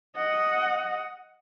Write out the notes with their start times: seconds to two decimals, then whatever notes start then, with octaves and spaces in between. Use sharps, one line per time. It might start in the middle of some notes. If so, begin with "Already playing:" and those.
0.17 D#5 F#5